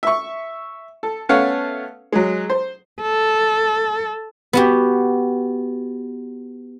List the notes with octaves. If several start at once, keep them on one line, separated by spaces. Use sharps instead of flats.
E5 C#6
A4
A3 B3 C#4 C#5 F5 F#5
F#3 G#3
C5
A4
B3 F#4 G4